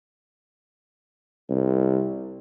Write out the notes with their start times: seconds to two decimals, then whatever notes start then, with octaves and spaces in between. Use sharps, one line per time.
1.49 C2